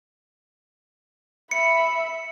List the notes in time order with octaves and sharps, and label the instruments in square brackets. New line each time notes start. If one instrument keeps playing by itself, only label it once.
[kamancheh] E5 B5 [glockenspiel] C#7